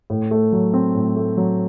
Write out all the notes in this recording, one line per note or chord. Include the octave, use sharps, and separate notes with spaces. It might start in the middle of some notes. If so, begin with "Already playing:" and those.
A2
A3
F#3
C4
A2
A3
F#3